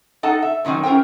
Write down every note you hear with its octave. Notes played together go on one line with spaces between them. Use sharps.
D#4 A4 F#5 A5
E5
A2 D#3 F#3 C4 G#5
C#4 E4 A#4 C5 G5